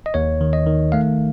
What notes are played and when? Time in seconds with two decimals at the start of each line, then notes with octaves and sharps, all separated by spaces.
0.06 D#5
0.14 D#2 C#5
0.41 D#3
0.53 D#5
0.67 D#3
0.92 A3 F5